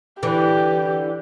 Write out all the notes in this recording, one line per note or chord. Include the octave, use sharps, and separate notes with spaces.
D3 E3 G4